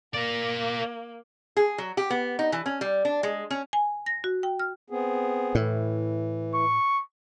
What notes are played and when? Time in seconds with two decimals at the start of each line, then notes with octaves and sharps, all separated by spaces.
0.14 A#3 A#4 D5
1.57 G#4
1.78 F#3
1.97 G4
2.10 B3
2.39 D#4
2.52 E3
2.66 C#4
2.81 G3
3.05 D4
3.23 G#3
3.50 C#4
3.73 G#5
4.06 A#6
4.24 F#4
4.43 G5
4.59 F6
4.90 B3 C4 G#4
5.55 A2 E3
6.55 C#6